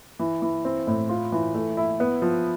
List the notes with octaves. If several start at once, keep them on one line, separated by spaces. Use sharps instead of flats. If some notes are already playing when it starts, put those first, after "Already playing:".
E3
E3
C4
A2
F4
E3
A3
E4
B3
F3